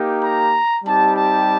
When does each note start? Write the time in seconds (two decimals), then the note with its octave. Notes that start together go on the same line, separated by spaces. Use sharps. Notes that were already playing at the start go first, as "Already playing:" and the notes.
Already playing: A#3 D#4 G4
0.23 A#5
0.84 G3 C4 D#4 G4 A5
1.16 A5